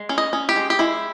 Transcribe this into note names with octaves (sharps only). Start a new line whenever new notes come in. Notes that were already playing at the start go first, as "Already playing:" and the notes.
Already playing: G#3
C#4
D#5
C#4
G4
G#3
G4
G#3 E4